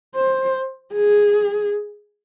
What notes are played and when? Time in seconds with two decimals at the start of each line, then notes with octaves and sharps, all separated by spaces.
0.16 C5
0.94 G#4